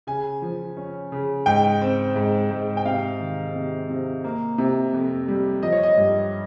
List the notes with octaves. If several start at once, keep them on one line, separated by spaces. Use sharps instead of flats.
C#3 G#5
F3
C#4
C#3
G#2 G5
C4
G#2
G#2
G5
C3 F5
D#3
C3
C3
A#3
C3
F2
G3
F3 D#5
C#5
D#5
G2